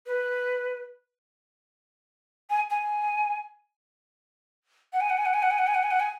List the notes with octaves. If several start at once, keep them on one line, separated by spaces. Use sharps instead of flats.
B4
G#5
G#5
F#5
G#5
F#5
G#5
F#5
G#5
F#5
G#5
F#5
G#5
F#5
G#5
F#5
G#5